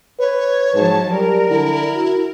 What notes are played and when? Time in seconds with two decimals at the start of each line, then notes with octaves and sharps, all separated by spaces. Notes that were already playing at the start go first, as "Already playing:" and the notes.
0.20 B4 C#5
0.75 G#2 F3 F#3 A5
1.11 G3 A#4
1.49 D3 E4
1.95 F#4